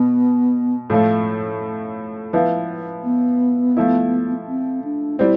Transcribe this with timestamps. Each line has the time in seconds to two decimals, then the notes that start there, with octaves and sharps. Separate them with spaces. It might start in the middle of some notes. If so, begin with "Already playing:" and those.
Already playing: B2 B3
0.90 A2 F3 A3
2.33 F3 B3 E4
3.04 B3
3.77 F3 A3 E4
4.48 C4
4.84 D4
5.19 G3 C4 E4